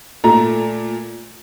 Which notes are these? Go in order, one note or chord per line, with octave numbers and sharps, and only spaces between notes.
A#2 A3 A#5